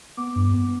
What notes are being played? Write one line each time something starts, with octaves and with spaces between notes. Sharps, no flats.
B3 D6
G2
B3